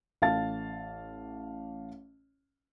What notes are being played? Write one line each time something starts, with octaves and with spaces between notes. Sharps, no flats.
A1 F5 A5 A6